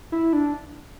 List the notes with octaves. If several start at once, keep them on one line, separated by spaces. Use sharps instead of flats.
E4
D4